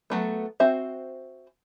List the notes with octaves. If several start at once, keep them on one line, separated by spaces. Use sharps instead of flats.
F#3 A3 B3
C4 F#4 C5 E5